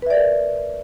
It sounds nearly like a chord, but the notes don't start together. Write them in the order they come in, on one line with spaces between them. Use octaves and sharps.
B4 E5 D5 A#4